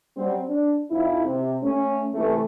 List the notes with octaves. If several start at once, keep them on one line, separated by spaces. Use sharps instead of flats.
F#3 G3 C4
D4
F2 F3 D#4 E4
C3
A3 C#4
C3 E3 A3